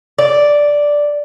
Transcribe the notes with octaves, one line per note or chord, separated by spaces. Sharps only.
D5